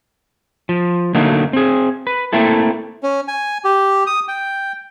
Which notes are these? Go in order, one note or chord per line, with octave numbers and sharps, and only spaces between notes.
F3
D3 F#3 A3 A#3 D#4
C4 G#4
B4
A3 A#3 C4 E4 A4
C#4
G#5
G4
D#6
G5